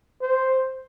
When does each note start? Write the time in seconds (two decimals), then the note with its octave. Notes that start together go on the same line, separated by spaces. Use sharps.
0.22 C5